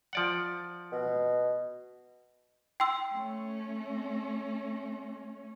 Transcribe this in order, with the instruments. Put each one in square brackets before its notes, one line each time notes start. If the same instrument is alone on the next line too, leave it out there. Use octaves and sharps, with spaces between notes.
[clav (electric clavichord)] F3 D5 F#5
[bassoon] B2
[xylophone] G5 C6 E6
[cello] A3 C#4